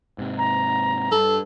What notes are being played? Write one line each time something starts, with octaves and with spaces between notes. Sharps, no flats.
G#2 C3
A#5
G2 A4